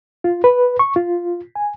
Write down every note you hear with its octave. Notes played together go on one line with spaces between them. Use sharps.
F4
B4
C#6
F4
G#5